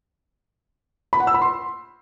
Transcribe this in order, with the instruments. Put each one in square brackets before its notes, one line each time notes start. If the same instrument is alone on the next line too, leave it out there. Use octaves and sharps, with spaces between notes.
[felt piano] B5
F#5
E6
B5
C6